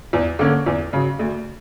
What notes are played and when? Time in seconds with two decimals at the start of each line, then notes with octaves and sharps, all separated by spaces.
0.13 E2
0.39 D3 A#3 C#4
0.66 E2
0.93 C#3 F#3
1.19 D2